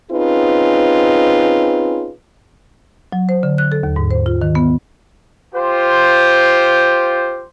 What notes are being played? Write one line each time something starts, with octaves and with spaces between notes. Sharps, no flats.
C4 C#4 D#4 F4 G#4 B4
F#3
C5
D3
F#6
A4
D#2
G#2
C5
F4
D#3
B3
F4 G4 C5